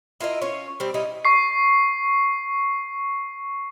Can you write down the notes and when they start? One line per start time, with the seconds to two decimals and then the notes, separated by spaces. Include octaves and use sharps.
0.20 E4 F4 A#4 D#5
0.42 C#4 F4 C#5
0.80 G3 C4
0.94 G3 C#4 D#4 E4
1.25 C#6 C7